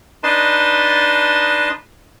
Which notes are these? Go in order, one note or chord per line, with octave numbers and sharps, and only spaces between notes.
D4 D#4 B4 D#5 A5 C6